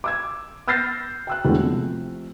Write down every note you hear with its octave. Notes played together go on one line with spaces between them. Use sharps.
D6 E6 G#6
E6 F6 G6 A6 A#6 C7
G5 E6 F#6
E2 D3 F#3 G#3 A3 B3
C3 F3 A3